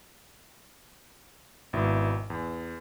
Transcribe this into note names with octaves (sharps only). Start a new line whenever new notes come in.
G#1 B2 E4 E5
E2